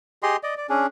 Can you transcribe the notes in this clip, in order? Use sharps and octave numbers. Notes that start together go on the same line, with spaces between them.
G4 G#4 D#5 C6
D5 D#5
D5
C#4 D4 G#4